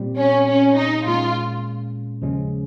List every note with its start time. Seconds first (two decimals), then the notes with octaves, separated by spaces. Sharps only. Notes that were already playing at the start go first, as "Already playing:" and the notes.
Already playing: A#2 G3 C4
0.19 C#4
0.48 C#4
0.77 D#4
1.05 A#2 G#3 C#4 F4
2.22 D#2 C#3 F3 G#3 C#4